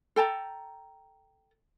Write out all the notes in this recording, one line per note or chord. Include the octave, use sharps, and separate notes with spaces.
A4 G5 A5 A#5